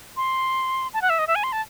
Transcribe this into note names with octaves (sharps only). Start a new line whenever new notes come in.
C6
A5
F#5
E5
D#5
E5
G#5
C6
A5